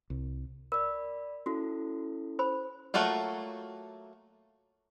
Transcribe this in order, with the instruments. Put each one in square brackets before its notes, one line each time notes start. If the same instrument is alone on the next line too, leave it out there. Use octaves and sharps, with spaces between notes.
[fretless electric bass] C2
[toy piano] A#4 [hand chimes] D5 B5
[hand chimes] C#4 E4 A4 [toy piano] F#4
[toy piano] C5 B5
[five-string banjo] F#3 A3 A#3 F4 F#4